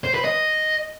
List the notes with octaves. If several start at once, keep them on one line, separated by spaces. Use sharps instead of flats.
C5
B4
D#5